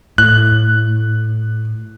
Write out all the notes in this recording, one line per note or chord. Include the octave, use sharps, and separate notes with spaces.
A2 F#6